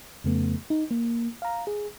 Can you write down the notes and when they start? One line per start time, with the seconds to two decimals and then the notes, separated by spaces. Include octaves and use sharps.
0.24 F2 C#3 A3 B3
0.70 D#4
0.91 A#3
1.42 F5 A#5
1.67 G#4